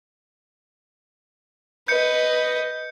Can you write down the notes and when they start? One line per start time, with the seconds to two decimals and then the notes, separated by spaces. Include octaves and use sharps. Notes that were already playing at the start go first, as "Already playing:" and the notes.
1.88 B4 D#5 G6 C#7